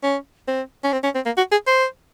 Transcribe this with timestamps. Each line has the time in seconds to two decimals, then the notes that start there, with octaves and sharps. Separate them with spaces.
0.03 C#4
0.48 C4
0.84 C#4
0.92 C4
1.04 C#4
1.15 C4
1.26 A#3
1.37 F#4
1.52 G#4
1.67 C5